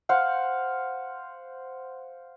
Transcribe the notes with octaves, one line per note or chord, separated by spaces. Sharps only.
C5 F5 F#5